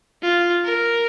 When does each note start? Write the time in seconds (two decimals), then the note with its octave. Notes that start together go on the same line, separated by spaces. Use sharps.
0.22 F4
0.65 A#4